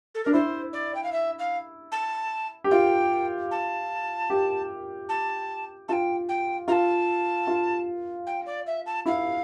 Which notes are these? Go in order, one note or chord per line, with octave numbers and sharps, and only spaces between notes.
A4
D4 A#4
E4 C5
D5
G5
F5
E5
F5
A5
G4
F4 G5
A5
G4
A5
F4 G5 A5
G5
F4 A5 A#5
F4
G5
D5
E5
A5
E4 F5